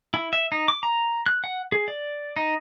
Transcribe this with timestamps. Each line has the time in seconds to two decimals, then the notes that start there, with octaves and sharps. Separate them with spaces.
0.14 E4
0.33 E5
0.52 D#4
0.68 D6
0.83 A#5
1.26 F#6
1.44 F#5
1.72 G#4
1.88 D5
2.36 D#4